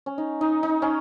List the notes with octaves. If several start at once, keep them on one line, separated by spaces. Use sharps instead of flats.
C#4
D#4
D#4
D#4
C#4